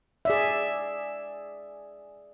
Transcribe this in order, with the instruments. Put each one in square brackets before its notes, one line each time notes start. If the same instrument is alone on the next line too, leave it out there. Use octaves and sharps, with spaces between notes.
[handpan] G#4 D5 E5